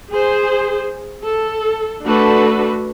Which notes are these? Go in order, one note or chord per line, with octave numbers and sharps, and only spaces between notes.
G#4 C5
A4
A3 D4 F#4 A4 B4